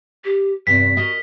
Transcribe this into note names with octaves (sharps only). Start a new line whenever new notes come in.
G4
E2 G2 C3 B4 B6
F#4 A#4 D#5